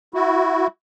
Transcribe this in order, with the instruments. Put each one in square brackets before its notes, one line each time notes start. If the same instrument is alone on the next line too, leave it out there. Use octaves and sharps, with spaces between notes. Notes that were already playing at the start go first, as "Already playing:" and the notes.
[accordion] E4 F#4